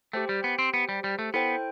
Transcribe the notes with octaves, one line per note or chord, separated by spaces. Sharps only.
A3 G4 C5 G5
G3
B3
C4
B3
G3
G3
A3
B3 E4 A4 C5 G5